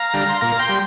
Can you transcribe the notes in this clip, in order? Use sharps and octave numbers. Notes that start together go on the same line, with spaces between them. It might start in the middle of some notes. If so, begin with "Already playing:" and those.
Already playing: F5 A#5
D3 G3
C6
A#2 F5 A#5
G5 C6
G3